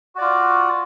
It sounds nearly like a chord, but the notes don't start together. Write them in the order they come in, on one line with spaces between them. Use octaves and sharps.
F#4 D5 F4